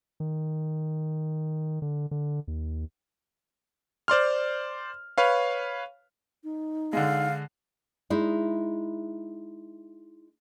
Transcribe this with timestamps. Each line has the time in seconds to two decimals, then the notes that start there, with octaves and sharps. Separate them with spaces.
0.20 D#3
1.82 D3
2.11 D3
2.48 D#2
4.08 C5 D5 C6 F6
5.18 B4 C#5 F5
6.44 D#4
6.93 D3 G#3 F5
8.10 G#3 D#4 E4